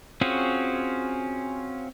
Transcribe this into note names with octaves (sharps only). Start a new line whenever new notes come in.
C4 C#4 F4 F#4 G#4